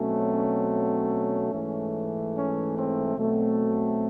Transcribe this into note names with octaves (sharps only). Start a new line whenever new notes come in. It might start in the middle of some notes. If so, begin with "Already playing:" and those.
Already playing: B2 F#3 A3 C4 C#4
C#4
C#4
G#2 E3 A3
C#4
C4
B2 F#3 A3 C4